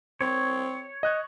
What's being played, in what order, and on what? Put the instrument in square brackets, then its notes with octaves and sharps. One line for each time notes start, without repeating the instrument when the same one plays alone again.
[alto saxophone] C4 [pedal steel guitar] C#5
[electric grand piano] D#5 F#6 G#6